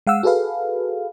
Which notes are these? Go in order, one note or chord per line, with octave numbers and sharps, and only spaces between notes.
G#3 F5 F#5 E6
F#4 G#4 A4 B4 F5